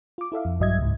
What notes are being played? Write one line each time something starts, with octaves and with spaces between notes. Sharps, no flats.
F4 D6
E4 A4 E5 F5
F2
A#1 G2 F#3 D#5 E5 G#6
C#2 G#2